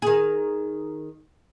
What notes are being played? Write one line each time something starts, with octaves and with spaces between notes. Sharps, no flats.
D#3 G#4